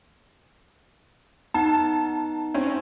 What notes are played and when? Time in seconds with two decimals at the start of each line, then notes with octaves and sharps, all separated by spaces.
1.54 B3 D#4 F#5 A5
2.54 C4 C#4